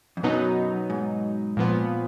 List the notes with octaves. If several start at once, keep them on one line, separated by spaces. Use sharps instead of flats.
F2
F#2 B2 F#3 B3 D#4
G#2
A#2 F3 B3